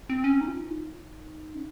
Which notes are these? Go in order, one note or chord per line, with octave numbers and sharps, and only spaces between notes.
C4
C#4
D#4
F4
D#4
C#4